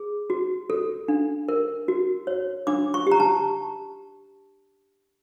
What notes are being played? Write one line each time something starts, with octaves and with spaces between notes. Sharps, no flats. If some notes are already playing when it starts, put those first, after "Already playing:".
Already playing: G#4
F#4
A4
D4
A#4
F#4
C#5
D4 D6
C#6
G4 A#5
A5